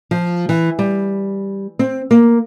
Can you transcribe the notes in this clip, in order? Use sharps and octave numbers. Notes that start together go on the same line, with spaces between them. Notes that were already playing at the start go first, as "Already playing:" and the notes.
F3
E3
G3
C4
A#3